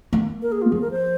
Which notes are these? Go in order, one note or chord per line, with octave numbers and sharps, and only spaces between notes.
A#3
A#4
G#4
F4
F3 G#4
A#4
C5